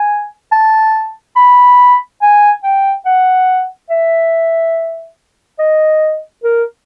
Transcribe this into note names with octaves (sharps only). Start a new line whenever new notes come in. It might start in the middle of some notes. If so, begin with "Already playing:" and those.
Already playing: G#5
A5
B5
G#5
G5
F#5
E5
D#5
A#4